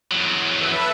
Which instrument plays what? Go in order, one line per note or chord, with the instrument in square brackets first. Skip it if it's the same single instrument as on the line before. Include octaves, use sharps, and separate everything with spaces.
[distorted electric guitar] E2 F#3
[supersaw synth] A4 B4 E5